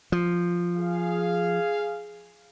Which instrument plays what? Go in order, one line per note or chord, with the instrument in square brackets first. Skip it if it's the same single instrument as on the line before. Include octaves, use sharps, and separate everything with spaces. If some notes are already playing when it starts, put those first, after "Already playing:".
[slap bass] F3
[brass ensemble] G#4 F5